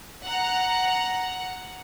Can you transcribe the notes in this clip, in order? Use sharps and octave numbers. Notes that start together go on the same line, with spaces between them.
F#5 A#5